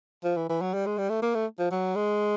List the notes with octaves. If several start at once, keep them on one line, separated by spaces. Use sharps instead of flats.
F3
E3
E3
F#3
G3
G#3
G3
A3
A#3
A3
F3
F#3
G#3